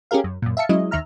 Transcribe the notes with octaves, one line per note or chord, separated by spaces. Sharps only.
C#4 G4 G#4 A#4 F5
F#2
F#2 A#2
E5 F5 A5 C#7
F#3 G#3 C#4 E4 D#5
D#2 D#3 E5 A#5 F6